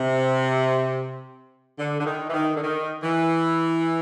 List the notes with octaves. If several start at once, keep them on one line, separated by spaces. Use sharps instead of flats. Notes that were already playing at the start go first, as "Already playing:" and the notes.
Already playing: C3
D3
D3
D#3
E3
D#3
D3
D#3
E3